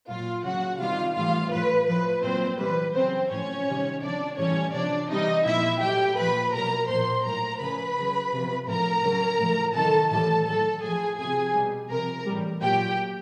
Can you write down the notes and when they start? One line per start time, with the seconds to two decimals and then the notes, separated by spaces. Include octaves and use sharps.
0.08 A#2 F#3 F4 F5
0.44 C#3 F#3 F#4 F#5
0.79 C3 D#3 G3 F4 F5
1.15 A2 E3 G3 F4 F5
1.52 A2 F3 B4
1.87 A2 F3 B4
2.23 A#2 F#3 C4 C5
2.58 C3 E3 G3 B4
2.94 C#3 F#3 C4 C5
3.30 A2 F3 C#4 C#5
3.67 C3 D#3 G3
4.02 C3 F3 D4 D5
4.38 A2 E3 G3 C#4 C#5
4.73 C3 F3 D4 D5
5.09 C3 E3 G3 D#4 D#5
5.45 A#2 F3 E4 E5
5.81 A2 F#3 G4 G5
6.16 A#2 F3 B4 B5
6.53 B2 F#3 A#4 A#5
6.88 A#2 F3 C5 C6
7.24 A2 F#3 A#4 A#5
7.60 C#3 F3 B4 B5
7.96 C#3 F#3
8.32 C3 F3
8.67 A2 F3 A#4 A#5
9.03 C#3 F#3
9.39 A2 F3
9.74 C3 D#3 F#3 A4 A5
10.11 A2 E3 G3 A4 A5
10.46 A2 F#3 A4 A5
10.82 A2 F3 G#4 G#5
11.18 C3 F3 G#4 G#5
11.54 B2 G3
11.90 C3 F3 A#4 A#5
12.26 A2 E3 G3
12.61 A#2 F#3 G4 G5